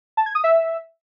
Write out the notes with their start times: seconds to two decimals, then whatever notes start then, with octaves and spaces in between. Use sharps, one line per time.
0.17 A5
0.26 G#6
0.35 D#6
0.44 E5